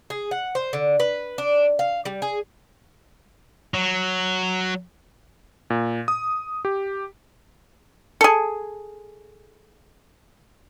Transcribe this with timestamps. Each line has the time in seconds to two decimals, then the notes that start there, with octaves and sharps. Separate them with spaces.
0.10 G#4
0.31 F#5
0.55 C5
0.73 D3
1.00 B4
1.38 D4
1.79 F5
2.05 G3
2.22 G#4
3.74 F#3
5.70 A#2
6.08 D#6
6.65 G4
8.21 G#4 A4